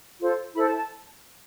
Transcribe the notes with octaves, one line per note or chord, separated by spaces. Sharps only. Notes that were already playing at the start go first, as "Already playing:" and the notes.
F4 A4 C5
E4 A4 C5 B5
A5
A5